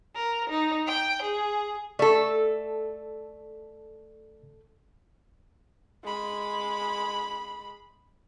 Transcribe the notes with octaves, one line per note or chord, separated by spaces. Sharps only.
A#4
D#4
G5
G#4
A3 A4 D5
G#3 B5